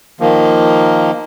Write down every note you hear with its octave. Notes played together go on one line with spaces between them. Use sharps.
D#3 F3 A#3